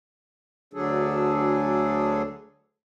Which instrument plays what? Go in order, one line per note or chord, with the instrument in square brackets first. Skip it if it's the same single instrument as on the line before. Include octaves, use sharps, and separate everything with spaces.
[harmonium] D2 D3 F#3 D4 G#4 A4